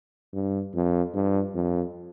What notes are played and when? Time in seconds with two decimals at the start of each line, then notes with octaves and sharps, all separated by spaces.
0.34 G2
0.74 F2
1.14 G2
1.55 F2